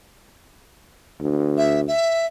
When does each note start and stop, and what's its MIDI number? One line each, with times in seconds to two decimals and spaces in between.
1.21 1.90 38
1.58 1.81 76
1.88 2.26 76